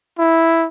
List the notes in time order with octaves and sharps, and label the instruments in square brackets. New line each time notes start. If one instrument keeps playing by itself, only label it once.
[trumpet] E4